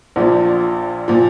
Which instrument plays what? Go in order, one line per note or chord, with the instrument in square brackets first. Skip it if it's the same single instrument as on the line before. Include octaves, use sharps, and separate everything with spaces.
[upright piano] A#1 A#2 F3
A#2 F3